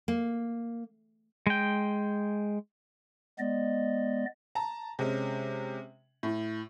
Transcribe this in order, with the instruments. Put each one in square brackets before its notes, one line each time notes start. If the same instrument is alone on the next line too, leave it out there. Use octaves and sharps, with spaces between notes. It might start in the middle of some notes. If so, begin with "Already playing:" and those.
[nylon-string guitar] A#3
[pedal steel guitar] G#3 G5
[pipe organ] G#3 B3 D5 D#5
[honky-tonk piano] A5 A#5
C3 G#3 C#4
A2